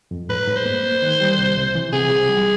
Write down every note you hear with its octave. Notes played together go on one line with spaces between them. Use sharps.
F2
G#2 B4
G#2
C5
A#3
A#3
D#3
G3
C2
C3
E3
C3 G#4
C2
G3